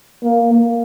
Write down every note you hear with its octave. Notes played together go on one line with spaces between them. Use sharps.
A#3
A#3